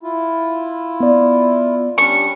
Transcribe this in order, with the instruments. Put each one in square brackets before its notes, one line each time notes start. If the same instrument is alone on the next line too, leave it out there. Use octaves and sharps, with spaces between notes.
[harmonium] E4 F4
[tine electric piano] B3 D5
[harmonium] G3 C#4 D4 [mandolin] C#6